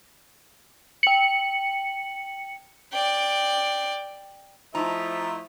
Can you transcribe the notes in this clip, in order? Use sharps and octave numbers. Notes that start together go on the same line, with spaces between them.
G5 C#7 F#7
D5 G5
F3 A3 D#4 E4 A#5